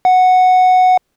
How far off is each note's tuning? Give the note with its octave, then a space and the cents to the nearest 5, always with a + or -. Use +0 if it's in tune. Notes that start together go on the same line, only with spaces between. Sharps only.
F#5 -5